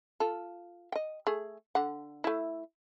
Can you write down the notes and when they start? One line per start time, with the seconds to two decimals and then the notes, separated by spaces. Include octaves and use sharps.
0.20 F4 A4
0.92 D#5 G5
1.27 A3 G#4
1.75 D3 F#5
2.24 A3 E4